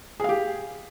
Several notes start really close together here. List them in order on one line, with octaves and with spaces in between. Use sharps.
G#4 F5 G4